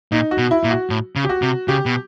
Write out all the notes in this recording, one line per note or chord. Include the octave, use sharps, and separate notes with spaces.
A#2 D#4
F#4
B2
E4
A#2
F#4
A2
C#3
G4
F#4
C3
C#3 G4
B2